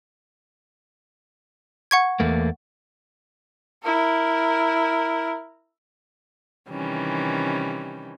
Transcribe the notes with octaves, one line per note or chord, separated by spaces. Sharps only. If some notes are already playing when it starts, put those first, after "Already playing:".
F#5 C#6 G#6
E2 A3 A#3
E4 A#4
C3 D#3 E3 G3 C#4